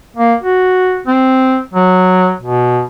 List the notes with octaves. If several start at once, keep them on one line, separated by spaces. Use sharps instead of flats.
A#3
F#4
C4
F#3
B2